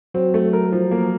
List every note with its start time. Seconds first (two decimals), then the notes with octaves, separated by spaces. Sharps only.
0.14 F#3 C4 F#4
0.34 A3
0.53 A#4
0.72 F3
0.91 A#3